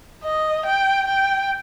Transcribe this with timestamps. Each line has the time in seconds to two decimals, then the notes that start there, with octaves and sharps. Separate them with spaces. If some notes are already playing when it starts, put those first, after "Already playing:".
0.24 D#5
0.66 G5
1.08 G5